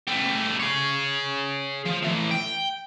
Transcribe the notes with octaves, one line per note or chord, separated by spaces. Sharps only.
A3 G4
G#4 C#5
F3
A2 E3
G5